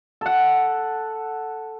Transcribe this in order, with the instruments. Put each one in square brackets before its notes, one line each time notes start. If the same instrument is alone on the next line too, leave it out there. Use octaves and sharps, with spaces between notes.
[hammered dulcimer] A4 F#5